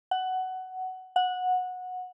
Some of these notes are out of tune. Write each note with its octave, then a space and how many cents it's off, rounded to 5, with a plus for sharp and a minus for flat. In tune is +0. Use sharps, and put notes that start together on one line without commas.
F#5 +15
F#5 -15